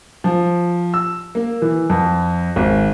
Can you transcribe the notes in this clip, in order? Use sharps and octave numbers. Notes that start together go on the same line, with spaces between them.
F3
E6
A#3
E3
F2
G#1